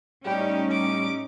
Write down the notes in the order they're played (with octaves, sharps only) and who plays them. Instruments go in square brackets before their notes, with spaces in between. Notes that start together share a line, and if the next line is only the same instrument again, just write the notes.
[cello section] A2 C#4 D#4 [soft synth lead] G3 [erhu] G4
[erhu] D6